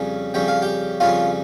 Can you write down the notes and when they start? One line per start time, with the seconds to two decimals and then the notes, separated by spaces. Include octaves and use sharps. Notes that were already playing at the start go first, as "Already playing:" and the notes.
Already playing: F2 C#3 G3 C#4
0.34 F2 C#3 G3 C#4 G5
0.48 F5
0.62 G4 G5
1.00 F2 C#3 G3 C#4 F4 F5